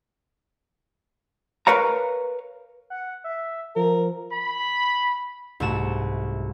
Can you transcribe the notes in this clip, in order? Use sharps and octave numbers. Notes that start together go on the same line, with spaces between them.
A#4 B4 C#5 F5 A#5
F#5
E5
F3 A#4
B5
C2 G#2 A3 F#4 E7